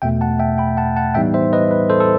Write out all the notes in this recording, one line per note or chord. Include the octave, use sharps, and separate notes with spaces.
E2 B2 A3 E5 G5
F#5 A5
E5 G5
G5 B5
F#5 A5
F#5 A5
A2 E3 G3 B3 D#4 E5 G5
C5 E5
B4 D#5
B4
A4 C5
A4